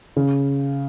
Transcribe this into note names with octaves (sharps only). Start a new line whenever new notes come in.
C#3